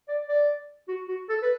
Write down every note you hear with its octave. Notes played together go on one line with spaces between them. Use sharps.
D5
D5
F#4
F#4
A4
B4